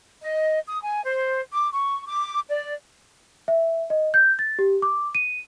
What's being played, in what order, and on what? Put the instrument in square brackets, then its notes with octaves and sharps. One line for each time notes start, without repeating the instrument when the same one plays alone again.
[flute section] D#5
D#6
G#5
C5
D6
C#6
D6
D5
[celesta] E5
D#5
G6
A6
G4
D6
D#7